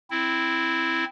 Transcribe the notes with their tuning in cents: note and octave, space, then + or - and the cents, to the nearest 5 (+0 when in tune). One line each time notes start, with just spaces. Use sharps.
C4 +0 E4 +0